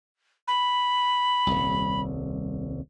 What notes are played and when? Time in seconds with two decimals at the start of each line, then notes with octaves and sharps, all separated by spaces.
0.48 B5
1.47 D#1 C2